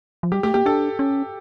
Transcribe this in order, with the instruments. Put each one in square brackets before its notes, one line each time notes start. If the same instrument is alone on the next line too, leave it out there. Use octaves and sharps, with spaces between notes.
[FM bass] F3
[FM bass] G3 [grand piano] G4
[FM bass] A3 [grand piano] G4
[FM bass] A#3 [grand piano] G4
[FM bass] D4 [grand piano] A4
[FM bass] C#4